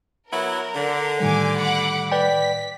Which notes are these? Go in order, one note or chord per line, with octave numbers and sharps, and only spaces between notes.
F#3 B3 E4 A#4
D3
A2 D#3 G3 G#5 D6
F#5 B5 D6
B4 D5 G5 B6